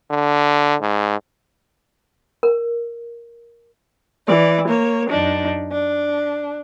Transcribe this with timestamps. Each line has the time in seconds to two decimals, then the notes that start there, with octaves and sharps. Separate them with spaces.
0.10 D3
0.81 G#2
2.43 A#4
4.27 E3 D5
4.68 A#3 C#5
5.08 F#2 D4 D#4
5.71 D4